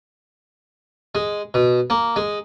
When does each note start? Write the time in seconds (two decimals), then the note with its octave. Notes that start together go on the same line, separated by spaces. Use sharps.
1.15 G#3
1.54 B2
1.90 A#3
2.16 G#3